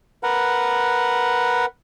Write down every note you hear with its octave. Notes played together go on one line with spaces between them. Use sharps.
A#4 B4 F#5